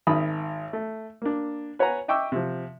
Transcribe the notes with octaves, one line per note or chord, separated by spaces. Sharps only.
G#1 D#3 E5 B5 D#6
A3
A#3 D4
B4 C#5 F#5 G#5 A#5
D#5 E5 G5 C#6 D6 E6
C3 F3